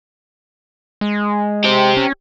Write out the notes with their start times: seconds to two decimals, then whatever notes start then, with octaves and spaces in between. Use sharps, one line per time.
1.01 G#3
1.64 G4 C5
1.97 C#4